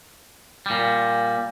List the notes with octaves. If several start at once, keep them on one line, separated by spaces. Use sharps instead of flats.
A#2 G3